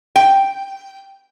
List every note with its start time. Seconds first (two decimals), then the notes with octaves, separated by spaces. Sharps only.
0.16 G5